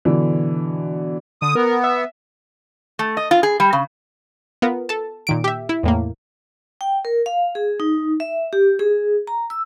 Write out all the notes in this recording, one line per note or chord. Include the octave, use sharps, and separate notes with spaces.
B2 D3 E3
D3 D#6
B3 A#4
E5
A3
D#5
F4
G#4
G3
C#3
B3 F4 A#4
A4 A5
A#2 D#3 D7
G4 E5
E4
E2 A2 A#3
G5
A#4
F5
G#4
D#4
E5
G4
G#4
A#5
E6